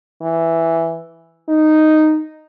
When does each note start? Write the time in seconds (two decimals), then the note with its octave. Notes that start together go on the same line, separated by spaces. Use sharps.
0.22 E3
1.49 D#4